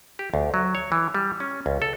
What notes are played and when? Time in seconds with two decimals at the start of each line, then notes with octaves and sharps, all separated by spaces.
0.19 G4
0.34 D2
0.54 F#3
0.75 C#5
0.92 E3
1.14 G3
1.40 C#4
1.66 C#2
1.82 A4